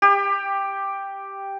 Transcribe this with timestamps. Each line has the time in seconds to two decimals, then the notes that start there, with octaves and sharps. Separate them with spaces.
0.02 G4